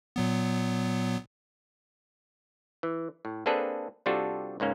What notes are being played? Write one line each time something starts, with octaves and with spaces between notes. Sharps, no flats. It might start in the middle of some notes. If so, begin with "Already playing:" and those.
A#2 F#3 B3
E3
A2
A#3 C4 D4 G#4 A4 B4
C3 G3 D4 F4 F#4 A4
C#2 G#2 A#3 C#4